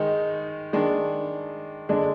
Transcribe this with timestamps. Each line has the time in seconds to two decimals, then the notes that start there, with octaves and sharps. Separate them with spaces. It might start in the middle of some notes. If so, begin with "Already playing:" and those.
Already playing: D#3 G#3 D#4
0.73 D#3 G#3 D4
1.89 D3 G#3 D4